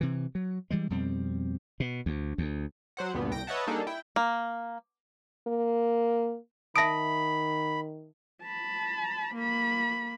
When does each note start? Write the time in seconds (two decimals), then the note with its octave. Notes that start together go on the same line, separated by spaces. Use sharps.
0.01 C3 E3
0.35 F#3
0.71 E3 G3 G#3
0.90 F2 B2 G3 C4
1.80 B2
2.06 D2
2.38 D2
2.97 F#3 C5 F#5
3.14 D2 G2 A#2 B3
3.31 C2 G5 A#6 D7
3.47 B4 C#5 D#5 E5 F#5 A5
3.67 G3 A#3 D4 D#4 G#4 A4
3.87 E4 G5
4.16 A#3
5.47 A#3
6.76 D#3 E5 A5 B5 D#6 A#6 D7
8.43 A5 B5
9.35 A#3 B5